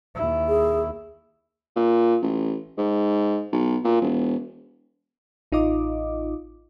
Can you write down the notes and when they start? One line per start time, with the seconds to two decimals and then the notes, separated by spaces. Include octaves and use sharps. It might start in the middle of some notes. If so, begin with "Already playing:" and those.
0.15 D#2 E4
0.48 G#4
1.76 A#2
2.22 A1
2.78 G#2
3.53 B1
3.84 A#2
4.01 E1
5.52 A1 D#4 F4 D#5 D6